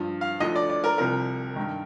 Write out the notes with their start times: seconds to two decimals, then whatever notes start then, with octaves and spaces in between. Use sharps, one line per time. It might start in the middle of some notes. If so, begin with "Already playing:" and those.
Already playing: G2 F3
0.21 F5
0.40 D2 D3 F3 D#5
0.56 D5
0.70 D5
0.84 A#4
0.98 C2 C3 F3 A#4
1.56 G2 D#3